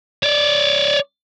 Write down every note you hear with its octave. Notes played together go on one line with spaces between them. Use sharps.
C#5 D5